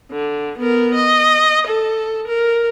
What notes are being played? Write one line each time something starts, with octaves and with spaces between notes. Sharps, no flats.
D3
B3 A#4
D#5
A4
A#4